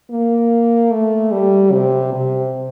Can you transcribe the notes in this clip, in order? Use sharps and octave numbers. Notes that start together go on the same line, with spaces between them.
A#3
A3
G3
C3
C3